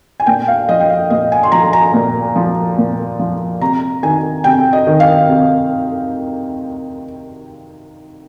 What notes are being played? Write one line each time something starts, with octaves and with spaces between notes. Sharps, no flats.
G#5
A#2 G5
F5
F3 D#5
G5
F5
A#2 D#5
G#5
C6
F3 A#5
A#5
A#2
F3
A#2
F3
C3 A#5
D#3 G#5
C3 G5
D#5
D#3
F5
C3